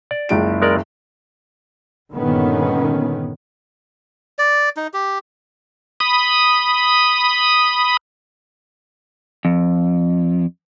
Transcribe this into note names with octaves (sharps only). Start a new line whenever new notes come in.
D5
F#1 C#2 D7
G#3 A#4 D5
G1 A#2 D3 D#3 B3 C#4
D5
D#4
G4
B5 D#6
F2